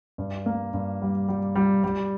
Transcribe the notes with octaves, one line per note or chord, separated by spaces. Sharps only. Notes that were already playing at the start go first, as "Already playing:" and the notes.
G2
A#3
G2
G3
G3
G3
G3